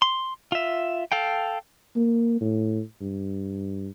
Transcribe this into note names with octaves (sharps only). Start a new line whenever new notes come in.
C6
F4 E5
A4 F5 G5
A#3
A2
G2